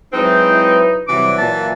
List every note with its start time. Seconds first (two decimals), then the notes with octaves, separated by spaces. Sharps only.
0.13 F#3 G#3 C4 D#4 E4 B4
1.08 C3 E3 F#3 G3 C4 D6
1.38 A#2 A5